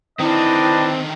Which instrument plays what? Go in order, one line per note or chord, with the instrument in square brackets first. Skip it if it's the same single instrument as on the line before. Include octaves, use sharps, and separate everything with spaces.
[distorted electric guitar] D3 D#3 [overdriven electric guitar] C4 [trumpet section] D4 B4 D#5 [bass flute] E4